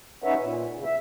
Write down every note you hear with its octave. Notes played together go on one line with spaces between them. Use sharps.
C#4 D#4 B4 C#5 E5 F#5
A#2
E2 C#3
E5